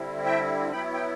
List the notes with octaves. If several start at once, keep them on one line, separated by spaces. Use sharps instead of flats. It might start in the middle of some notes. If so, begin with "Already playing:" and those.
Already playing: D3 G3 C4 E4
E5 G5
F#3 B3 E4 G5 B5
G5